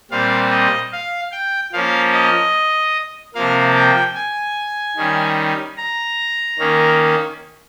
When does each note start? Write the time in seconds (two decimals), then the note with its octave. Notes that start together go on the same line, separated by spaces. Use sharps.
0.11 A#2 G3 C4 F5
0.51 D#5
0.92 F5
1.32 G5
1.72 F3 A#3 C#4 F5
2.13 D#5
3.35 C3 F3 A#3 F5
3.75 G5
4.15 G#5
4.96 D#3 G3 C#4
5.77 A#5
6.59 D#3 A#3 C#4